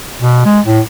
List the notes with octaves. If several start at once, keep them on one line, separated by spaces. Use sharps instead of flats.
B2
G#3
A2